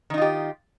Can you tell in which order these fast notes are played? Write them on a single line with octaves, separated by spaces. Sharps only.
D#3 D#4 F4 G4